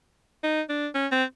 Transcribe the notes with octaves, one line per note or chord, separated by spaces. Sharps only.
D#4
D4
C#4
C4